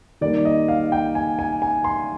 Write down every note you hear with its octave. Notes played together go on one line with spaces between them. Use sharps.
D#3 G3 A#3 D5
D#5
F5
G5
G#5
G#5
G#5
C6